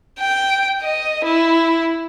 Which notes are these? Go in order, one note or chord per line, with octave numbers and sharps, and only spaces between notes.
G5
D#5
E4